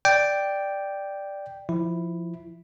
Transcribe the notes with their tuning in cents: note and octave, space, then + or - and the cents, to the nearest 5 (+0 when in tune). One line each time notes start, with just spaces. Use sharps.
D5 +0 G5 +0
F3 -10 E4 +0